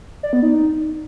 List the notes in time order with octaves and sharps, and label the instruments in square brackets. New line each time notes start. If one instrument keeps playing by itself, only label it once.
[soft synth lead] D5
B3
D#4